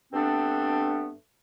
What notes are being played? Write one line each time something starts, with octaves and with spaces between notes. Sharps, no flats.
G2 A3 B3 C4 D4